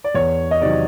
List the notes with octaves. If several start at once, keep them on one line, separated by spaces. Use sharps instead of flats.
D5
E2 C#5
D#5
C3 D#3 F#3 D5